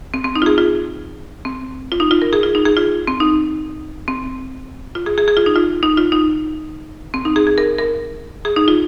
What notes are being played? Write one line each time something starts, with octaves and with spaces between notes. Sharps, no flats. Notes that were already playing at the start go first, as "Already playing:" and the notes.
C4
C4
D#4
F4
G#4
F4
C4
F4
D#4
F4
A#4
G#4
F4
D#4
G#4
F4
C4
D#4
C4
F4
G#4
G#4
G#4
F4
D#4
F4
D#4
F4
D#4
C4
D#4
G#4
G#4
A#4
A#4
G#4
D#4
F4